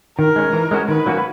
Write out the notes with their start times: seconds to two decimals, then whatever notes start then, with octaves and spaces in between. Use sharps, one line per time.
0.18 D#3 A#4
0.36 G#3 C#4
0.53 E3
0.71 G#3 C#4 F#4
0.88 D#3 B4
1.06 F#3 A#3 C#4 F#4